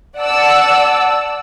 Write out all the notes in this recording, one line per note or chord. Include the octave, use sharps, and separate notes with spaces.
D5 F#5 A5 E6